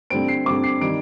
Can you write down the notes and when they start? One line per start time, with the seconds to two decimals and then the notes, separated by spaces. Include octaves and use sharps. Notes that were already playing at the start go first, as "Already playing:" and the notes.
0.10 D3 G3 C4 D7
0.28 C7
0.46 D3 G3 C4 D6
0.64 C7
0.81 D#3 G3 D7